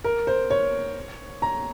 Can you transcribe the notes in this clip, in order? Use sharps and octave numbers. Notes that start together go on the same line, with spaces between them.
A#4
C5
C#5
A#5